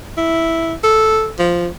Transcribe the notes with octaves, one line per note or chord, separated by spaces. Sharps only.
E4
A4
F3